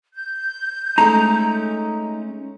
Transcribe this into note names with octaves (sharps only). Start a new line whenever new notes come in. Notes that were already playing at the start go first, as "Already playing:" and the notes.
G6
G#3 A3 C#4 D#4 A#5